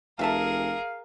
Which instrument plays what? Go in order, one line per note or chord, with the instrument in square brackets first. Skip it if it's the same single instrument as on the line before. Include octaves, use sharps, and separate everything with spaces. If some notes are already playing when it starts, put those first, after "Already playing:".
[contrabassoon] F1 [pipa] E3 E5 A5 [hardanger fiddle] G#4 A#4 [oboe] F5